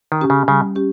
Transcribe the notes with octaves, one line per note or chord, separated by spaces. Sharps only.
D#3
C#4 G4
C#3
C#3 G3
C#4 G4